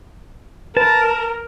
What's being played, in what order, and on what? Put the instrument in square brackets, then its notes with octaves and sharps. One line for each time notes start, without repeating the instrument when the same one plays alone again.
[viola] A#4 [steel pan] B4 [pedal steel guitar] A5